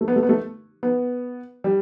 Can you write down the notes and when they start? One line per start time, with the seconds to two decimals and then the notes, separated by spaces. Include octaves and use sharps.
0.01 A3
0.08 B3
0.16 A3
0.23 B3
0.29 A3
0.83 B3
1.64 G3